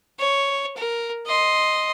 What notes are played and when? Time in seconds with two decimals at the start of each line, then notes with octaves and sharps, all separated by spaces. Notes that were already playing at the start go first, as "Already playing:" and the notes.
0.19 C#5
0.76 A#4
1.26 D#5 C6